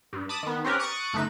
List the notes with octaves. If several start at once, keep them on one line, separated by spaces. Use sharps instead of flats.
G2
A5 B5 D6 D#6
D#3 B3
C4 C#4 G4 A#4 B4
C#6 D#6 F#6 A6 C#7 D7
G1 A3 D#4 B4 E7